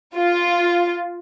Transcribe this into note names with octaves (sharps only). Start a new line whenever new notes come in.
F4